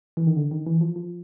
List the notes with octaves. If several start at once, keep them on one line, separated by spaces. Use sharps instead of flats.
E3
D#3
D3
D#3
E3
F3
F3